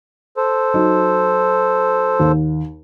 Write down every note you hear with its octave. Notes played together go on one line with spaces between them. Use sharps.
A4 C5
F#3 D#4
D#2